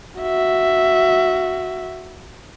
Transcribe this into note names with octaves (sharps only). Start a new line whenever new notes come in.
F#4 E5